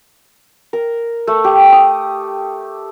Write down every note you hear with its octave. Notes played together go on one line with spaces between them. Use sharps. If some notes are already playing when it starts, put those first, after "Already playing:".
A#4
A3
G4
D#6